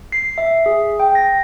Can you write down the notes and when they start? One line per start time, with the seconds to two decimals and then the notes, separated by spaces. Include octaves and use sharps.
0.12 C7
0.38 E5
0.66 G#4
1.00 G5
1.15 A#6